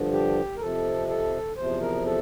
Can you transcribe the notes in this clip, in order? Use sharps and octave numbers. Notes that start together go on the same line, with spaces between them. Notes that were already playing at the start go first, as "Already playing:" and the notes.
Already playing: G2 D3 F3
G4
A#4
F2 C3 F3 A4
A4
E2 C3 F3 C5
A#4
A4